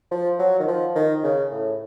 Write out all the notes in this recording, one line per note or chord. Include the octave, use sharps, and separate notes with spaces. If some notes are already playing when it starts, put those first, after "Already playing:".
F3
F#3
D#3
F3
D#3
C#3
A2